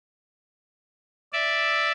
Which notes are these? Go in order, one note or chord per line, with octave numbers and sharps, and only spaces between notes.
D5 E5